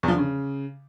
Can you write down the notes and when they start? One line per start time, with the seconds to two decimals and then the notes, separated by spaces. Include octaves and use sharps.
0.03 E2
0.08 F3
0.13 D3
0.18 C#3